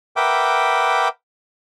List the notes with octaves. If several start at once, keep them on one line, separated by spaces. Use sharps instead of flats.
A#4 B4 E5 F#5 G5 D6